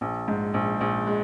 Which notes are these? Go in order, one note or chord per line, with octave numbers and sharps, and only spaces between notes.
A#1
G#2
A#1
A#1
G#3